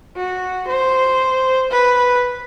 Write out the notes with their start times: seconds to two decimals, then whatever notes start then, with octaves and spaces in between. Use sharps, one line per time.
0.16 F#4
0.67 C5
1.71 B4